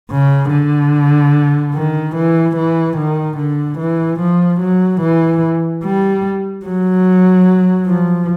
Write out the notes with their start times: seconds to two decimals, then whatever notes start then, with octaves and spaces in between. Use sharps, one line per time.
0.11 C#3
0.52 D3
1.74 D#3
2.16 E3
2.57 E3
2.97 D#3
3.37 D3
3.79 E3
4.20 F3
4.61 F#3
5.01 E3
5.84 G3
6.65 F#3
7.87 F3